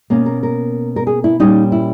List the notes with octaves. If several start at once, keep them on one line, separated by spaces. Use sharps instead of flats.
B2 A#3 C#4
A#4
A#4
A#4
G#4
E4
A#2 G3 C#4 D#4
E4